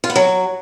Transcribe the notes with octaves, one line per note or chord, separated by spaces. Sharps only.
F4
B3
F#3